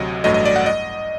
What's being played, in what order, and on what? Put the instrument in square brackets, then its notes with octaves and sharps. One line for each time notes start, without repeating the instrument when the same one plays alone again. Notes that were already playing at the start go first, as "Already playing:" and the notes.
Already playing: [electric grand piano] D2 C3 F#3 D#5
A1 G2 F#3 A3 D#5
D#5
D5
F#5
D#5